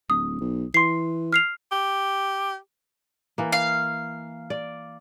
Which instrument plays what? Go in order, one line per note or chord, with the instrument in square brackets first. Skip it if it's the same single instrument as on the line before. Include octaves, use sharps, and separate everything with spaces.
[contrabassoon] D1 [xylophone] D#6
[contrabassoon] B1
[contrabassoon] E3 [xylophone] C6 C7
[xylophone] F6 C7 F7
[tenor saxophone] G4
[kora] E3 A#3
[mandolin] F5
[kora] D5